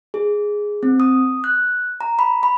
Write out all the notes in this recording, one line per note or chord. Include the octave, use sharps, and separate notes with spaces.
G#4
C4
D#6
F#6
A#5
B5
B5